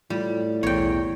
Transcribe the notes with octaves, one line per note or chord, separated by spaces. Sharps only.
A2 G3 F4
B1 E2 C#5 G5